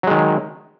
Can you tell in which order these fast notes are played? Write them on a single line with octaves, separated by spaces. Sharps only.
F#3 G#3 D#3